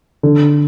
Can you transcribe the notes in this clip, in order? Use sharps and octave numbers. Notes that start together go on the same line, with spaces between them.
D3